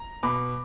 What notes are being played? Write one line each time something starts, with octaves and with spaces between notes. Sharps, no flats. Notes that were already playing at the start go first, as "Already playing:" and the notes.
Already playing: A#5
B2 B5 D6